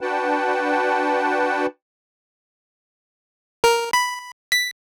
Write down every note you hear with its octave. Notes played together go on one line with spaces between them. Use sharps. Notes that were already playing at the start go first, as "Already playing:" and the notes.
D4 F#4 B4 F#5 G5 A5
A#4
B5
B6